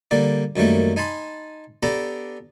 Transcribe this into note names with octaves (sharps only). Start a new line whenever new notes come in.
D3 G3 A#3 D5
F#2 D#3 G3 A3 A#3
D#4 G#5 A5 B5 C6
B3 D4 G4 A4 A#5 B5